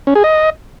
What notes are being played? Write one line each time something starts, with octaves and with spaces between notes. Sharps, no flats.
C#4
G#4
D#5